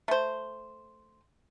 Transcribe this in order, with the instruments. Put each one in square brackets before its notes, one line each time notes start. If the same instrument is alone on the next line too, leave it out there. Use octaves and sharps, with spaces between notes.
[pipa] A3 C5